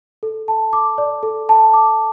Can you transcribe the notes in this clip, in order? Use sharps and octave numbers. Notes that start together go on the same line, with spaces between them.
A4
A5
D6
D5
A4
A5
D6